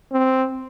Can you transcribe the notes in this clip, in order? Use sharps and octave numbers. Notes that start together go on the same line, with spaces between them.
C4